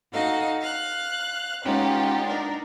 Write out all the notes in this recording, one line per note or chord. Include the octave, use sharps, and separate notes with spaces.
D#4 F#4 A4 D#5 F5
F5 F#6
G#3 B3 C#4 D#4 F4 G4
D4 D#4 A#4